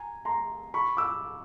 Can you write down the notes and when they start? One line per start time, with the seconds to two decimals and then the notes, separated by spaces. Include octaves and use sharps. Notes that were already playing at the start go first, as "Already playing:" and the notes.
Already playing: G#5 A#5
0.25 A#5 C6
0.74 B5 C#6
0.97 D6 E6